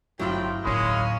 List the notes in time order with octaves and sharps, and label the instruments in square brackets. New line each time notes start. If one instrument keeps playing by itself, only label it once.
[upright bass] G1 [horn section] A2 C3 G5 [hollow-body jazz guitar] F#3 E4 F4
[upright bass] D1 D#4 [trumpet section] G#3 B5 [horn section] A#3 C#4